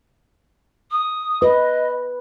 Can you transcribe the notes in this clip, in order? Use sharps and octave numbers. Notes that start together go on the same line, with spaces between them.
D#6
B4 D#5